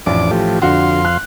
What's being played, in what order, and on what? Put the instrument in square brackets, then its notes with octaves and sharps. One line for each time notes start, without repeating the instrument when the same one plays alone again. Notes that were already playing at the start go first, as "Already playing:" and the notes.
[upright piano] A1 [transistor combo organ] F2 D4 D6
[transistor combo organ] F3 A3 G4
[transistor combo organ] F2 F5 C6 [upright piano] D3 F#4
[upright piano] F#6